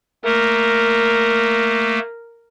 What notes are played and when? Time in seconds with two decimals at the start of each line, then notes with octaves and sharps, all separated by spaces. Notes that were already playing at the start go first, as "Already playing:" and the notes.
0.24 A3 A#3 A#4